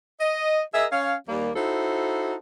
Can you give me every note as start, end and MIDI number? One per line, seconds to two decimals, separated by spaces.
0.20 0.61 75
0.74 0.86 68
0.74 0.86 70
0.74 0.86 75
0.74 0.86 76
0.92 1.14 61
0.92 1.14 73
0.92 1.14 77
1.28 1.50 39
1.28 1.50 55
1.28 1.50 58
1.55 2.35 63
1.55 2.35 64
1.55 2.35 66
1.55 2.35 69
1.55 2.35 72